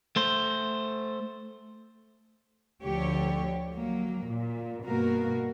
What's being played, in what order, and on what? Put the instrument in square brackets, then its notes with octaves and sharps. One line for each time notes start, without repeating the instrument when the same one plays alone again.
[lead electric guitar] A3 C5
[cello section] D2 D3 F3 G4 C#5
F#3 A#3
A#2
G2 B2 A#3 F#4 A#4